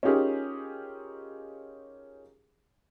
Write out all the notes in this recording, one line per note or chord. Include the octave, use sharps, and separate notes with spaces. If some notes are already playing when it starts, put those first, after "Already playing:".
C#4 D#4 F4 G4 G#4 A#4